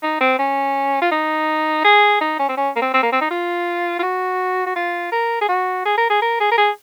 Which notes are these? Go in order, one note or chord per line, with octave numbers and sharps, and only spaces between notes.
D#4
C4
C#4
F4
D#4
G#4
D#4
C#4
C4
C#4
A#3
C4
C4
A#3
C4
D#4
F4
F4
F#4
F#4
F4
A#4
G#4
F#4
G#4
A#4
G#4
A#4
G#4
A#4
G#4